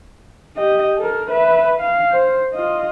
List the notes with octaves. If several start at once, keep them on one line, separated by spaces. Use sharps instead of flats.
G4 D#5
A4 A#4
B4 E5
F5
C5
F4 D#5